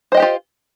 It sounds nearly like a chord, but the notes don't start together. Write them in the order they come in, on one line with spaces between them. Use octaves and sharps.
C5 D#5 G5 G4 F4